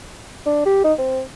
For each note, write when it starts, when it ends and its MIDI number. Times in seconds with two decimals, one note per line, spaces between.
0.46 0.65 62
0.66 0.80 67
0.84 0.93 63
0.98 1.21 60